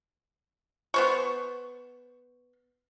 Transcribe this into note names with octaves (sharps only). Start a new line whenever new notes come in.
B3 C5 C#6